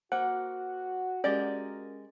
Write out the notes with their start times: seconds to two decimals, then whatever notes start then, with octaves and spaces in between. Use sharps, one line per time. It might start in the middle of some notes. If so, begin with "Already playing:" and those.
0.12 A#3 F#4 C5 F#5
1.24 G#3 C#4 F#4 G4 A#4 D5 A6